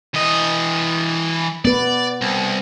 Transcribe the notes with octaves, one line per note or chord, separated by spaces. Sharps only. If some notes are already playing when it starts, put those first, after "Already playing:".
E3 D#5
B3 B4 D5
C2